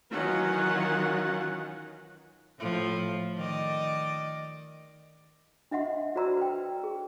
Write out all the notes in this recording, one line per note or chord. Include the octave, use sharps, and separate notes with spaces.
D#3 E3 F#3 C#4 F4 F#5
A2 F3
D#3 D5 D#5
D4 D#5 E5 F#5 C6
F#4 C5 D5 A#5 C6 E6
B4 G5
G#4